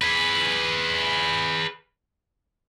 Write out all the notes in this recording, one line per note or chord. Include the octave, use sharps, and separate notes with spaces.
G#4 B4